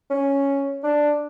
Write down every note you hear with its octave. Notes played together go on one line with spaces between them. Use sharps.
C#4
D4